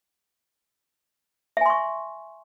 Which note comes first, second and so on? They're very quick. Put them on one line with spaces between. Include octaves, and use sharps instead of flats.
E5 G#5 C6 C#6